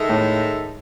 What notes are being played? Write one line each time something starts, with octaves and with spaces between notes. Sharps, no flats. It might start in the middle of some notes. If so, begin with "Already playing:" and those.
Already playing: D#3 G#3 D#4 A4 E5
A2